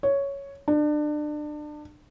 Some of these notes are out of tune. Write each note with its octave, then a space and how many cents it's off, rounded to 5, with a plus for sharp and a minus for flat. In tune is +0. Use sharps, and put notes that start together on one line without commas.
C#5 +5
D4 +30